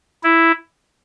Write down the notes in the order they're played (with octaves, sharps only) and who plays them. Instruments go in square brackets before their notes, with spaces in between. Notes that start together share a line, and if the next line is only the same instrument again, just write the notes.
[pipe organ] E4